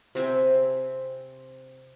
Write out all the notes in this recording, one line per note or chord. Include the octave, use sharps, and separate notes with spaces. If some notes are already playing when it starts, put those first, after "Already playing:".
C3 C4 E5 G#5